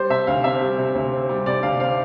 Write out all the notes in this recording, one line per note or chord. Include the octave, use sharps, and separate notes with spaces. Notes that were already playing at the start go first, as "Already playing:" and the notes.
Already playing: G3 C5
C3 E5
D2 F5
C4 E5
G3
C3
D2
C4
G3
C3 D5
D2 F5
C4 F5